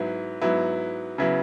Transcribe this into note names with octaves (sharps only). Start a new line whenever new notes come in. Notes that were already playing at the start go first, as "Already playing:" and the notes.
Already playing: G#2 F#3 B3 E4
G#2 F#3 B3 E4
C#3 F#3 B3 E4